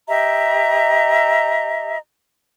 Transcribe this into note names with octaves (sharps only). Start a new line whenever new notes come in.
G4 D#5 E5 A#5